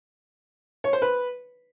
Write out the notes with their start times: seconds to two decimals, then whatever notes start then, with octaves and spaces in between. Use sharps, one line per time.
0.84 C#5
0.93 C5
1.02 B4